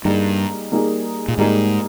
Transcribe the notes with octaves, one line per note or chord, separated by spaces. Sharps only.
G2 G3 A#3 D#4 G#4
G3 A#3 D#4 G#4
A#2
G#2 G3 A#3 D#4 G#4